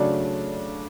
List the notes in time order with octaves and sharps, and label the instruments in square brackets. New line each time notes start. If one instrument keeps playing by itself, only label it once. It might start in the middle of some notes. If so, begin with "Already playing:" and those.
Already playing: [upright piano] C#3 F#3 A3 [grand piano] D4